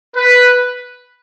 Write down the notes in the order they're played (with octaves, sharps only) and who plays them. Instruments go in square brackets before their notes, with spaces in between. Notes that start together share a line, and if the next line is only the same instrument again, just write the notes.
[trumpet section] B4